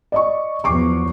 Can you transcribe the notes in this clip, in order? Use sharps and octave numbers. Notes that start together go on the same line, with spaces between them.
D5 D#5 C#6
E2 F3 F#3 C#6 D6 C7